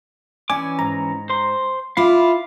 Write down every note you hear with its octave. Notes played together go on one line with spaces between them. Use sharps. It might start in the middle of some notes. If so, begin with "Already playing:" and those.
E3 C#4 D5 G#5 D6
G#2 A#5
C5 C6
E4 F4 F5 B5 D6